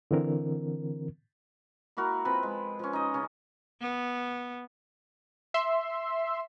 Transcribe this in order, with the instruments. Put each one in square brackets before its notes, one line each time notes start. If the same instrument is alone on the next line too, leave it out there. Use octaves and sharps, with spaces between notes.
[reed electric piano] D3 E3 C4 A#4
[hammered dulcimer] A#3 E4 F#4 A#4
F3 C4 B4 B5
G#3
F3 C#4
D#4 D#5
C#3 C#4
[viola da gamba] B3
[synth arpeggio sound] E5 C6